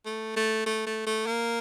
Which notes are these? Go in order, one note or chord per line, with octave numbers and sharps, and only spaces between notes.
A3
A3
A3
A3
A3
A#3